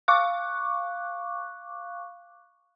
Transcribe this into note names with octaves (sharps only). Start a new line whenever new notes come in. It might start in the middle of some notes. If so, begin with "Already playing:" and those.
F5 C#6 D6 F#6